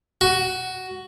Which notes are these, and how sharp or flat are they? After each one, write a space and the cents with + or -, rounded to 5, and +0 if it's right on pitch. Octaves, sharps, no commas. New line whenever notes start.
F#4 +10